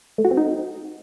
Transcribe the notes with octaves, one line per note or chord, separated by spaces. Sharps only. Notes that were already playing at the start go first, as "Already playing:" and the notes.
A3
F#4
C4
D#4